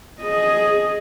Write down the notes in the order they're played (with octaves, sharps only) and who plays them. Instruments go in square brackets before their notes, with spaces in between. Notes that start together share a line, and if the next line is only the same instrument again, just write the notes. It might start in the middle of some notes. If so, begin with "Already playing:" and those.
[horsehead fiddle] G#4 D#5